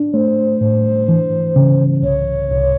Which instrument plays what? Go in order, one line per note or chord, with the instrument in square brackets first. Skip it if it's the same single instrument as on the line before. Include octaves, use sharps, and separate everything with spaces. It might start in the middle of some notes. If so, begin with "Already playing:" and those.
Already playing: [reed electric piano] D4
[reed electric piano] A3 [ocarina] C5 C#5
[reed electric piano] A2
E3
C#3
[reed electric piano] C2 [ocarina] C#5
[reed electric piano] C2